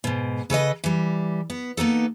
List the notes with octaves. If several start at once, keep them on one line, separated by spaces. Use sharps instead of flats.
G#2 B2
C#3 A4 B4 D#5
E3 G3
B3
A#3 B3 D#4 A4